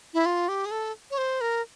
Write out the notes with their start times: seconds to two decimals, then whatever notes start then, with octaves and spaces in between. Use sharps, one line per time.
0.14 E4
0.26 F4
0.48 G4
0.66 G#4
0.71 A4
1.11 C#5
1.18 C5
1.41 A#4